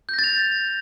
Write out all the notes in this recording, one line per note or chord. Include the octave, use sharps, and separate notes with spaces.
G6 A6 A#6 F7